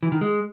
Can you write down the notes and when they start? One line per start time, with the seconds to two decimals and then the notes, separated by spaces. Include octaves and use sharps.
0.03 E3
0.12 D#3
0.21 G#3